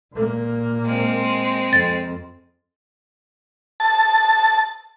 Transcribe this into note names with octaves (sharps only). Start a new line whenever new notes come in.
A#2 A#3
G#3 C4
F2 A6
A5